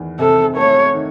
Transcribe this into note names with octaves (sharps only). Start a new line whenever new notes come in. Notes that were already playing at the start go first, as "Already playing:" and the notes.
Already playing: E2 D#3
C3 A4
A3 C#5
D#3